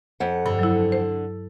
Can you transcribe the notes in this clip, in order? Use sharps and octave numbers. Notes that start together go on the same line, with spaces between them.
F2 F#5
G2 D3
F#3 E4
C5